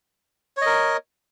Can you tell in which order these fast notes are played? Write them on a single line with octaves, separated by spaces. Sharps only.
C#5 D#5 A#4